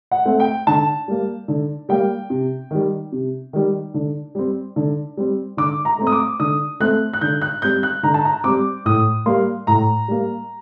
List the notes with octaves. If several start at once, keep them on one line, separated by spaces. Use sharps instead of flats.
F#5
A3 C4
G5
D3 A5
G3 A#3
D3
G3 A#3 G5
C3
D#3 G3
C3
D#3 G3
D3
G3 C4
D3
G3 C4
D3 D6
A#5
A3 C4
D#6
D6
D3 D#6
A3 C4 F#6
F#6
D3 G6
F#6
G3 C4 G6
F#6
D3 A#5
A5
A#5
G3 C4 D6
A2 D#6
G3 A#3 C6
A2 A#5
G3 A#3